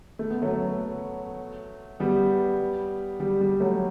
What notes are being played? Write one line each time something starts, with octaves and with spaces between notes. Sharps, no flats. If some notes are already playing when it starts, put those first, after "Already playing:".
A3
B3
F#3 A3
G3 B3
G3
G3
F#3 A3